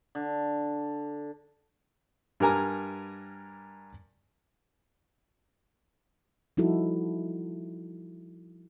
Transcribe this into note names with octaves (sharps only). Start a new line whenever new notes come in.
D3
G2 G3 A#4 G#5 A#5
F3 G3 D#4 E4 F#4 A4